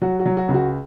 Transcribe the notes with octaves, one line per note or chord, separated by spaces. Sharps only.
F#3 F#4
F#4
F#3
F#4
C#2
F#4